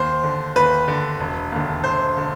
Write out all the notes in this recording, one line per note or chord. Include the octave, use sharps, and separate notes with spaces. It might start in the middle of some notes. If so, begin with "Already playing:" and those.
Already playing: D#2 C5
D3
D#2 B4
D3
E1
D#2 D3
E1 C5
D3